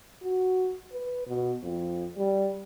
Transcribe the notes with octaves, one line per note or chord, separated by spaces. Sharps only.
F#4
B4
B2
F2
G3